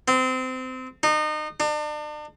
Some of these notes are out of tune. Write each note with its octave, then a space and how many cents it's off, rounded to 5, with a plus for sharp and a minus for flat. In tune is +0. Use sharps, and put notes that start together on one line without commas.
C4 -25
D#4 -30
D4 +40